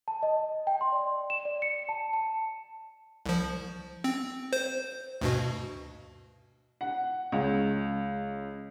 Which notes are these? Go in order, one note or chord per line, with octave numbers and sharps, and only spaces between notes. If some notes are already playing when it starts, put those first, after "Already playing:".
A5
D#5
G5
C6
D5
E7
D5
C#7
A5
A5
C2 F3
C4
C5
D2 G2 B2
F#5
C#2